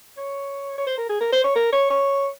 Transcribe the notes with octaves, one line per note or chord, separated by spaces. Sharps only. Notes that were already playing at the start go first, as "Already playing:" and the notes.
C#5
C#5
C5
A#4
G#4
A#4
C5
C#5
A#4
C#5
C#5